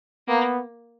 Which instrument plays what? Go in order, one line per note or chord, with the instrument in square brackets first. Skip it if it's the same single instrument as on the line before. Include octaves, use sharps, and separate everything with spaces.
[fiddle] A#3 [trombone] B3